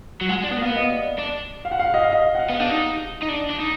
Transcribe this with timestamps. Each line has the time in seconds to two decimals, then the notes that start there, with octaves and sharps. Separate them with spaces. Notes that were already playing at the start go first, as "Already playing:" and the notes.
0.22 F#3
0.29 G#3 F#5
0.44 D4
0.52 B3
0.58 A#3
0.62 B3 F5
0.76 D#5
0.90 D5
1.19 D4
1.65 F5
1.71 F#5
1.80 F5
1.94 D#5
2.03 F5
2.12 D#5
2.35 F#5
2.39 F5
2.50 B3
2.60 D4
2.69 D#4
3.23 D#4
3.29 D4
3.50 D4
3.60 D#4